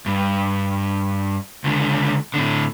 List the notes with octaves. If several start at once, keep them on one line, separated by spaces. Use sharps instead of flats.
G2
C#2 D3
A2 D3